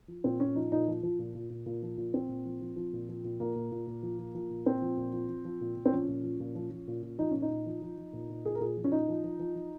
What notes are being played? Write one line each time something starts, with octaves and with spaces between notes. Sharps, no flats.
F3
A#2 C4
A#2 C#4
F3 D#4
A#2 D#4
F3
F3
A#2
A#2
A#2
A#2
F3
A#2
A#2 C4
A#2
F3
F3
F3
A#2
F3
A#2
A#2 A#3
A#2
A#2
A#2
F3
F3
F3
A#2
A#2 C4
F3
A#2
F3
F3
F3
A#2
A#2
C4
F3 C#4
A#2
F3
A#2
F3
F3
A#2
A#2
F3 D#4
A#2 C#4
D#4
A#2
F3
F3
F3
A#2
A#2
A#2 G#4
A#4
A#2 G#4
F3
C#4
A#2 D#4
F3
F3
F3
F3